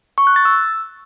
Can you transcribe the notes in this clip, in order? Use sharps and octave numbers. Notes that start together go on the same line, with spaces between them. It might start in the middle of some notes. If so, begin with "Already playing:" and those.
C#6
F#6
A6
E6